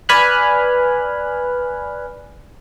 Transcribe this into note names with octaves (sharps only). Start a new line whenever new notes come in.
B4 D5 G#5 B5 F6 F#6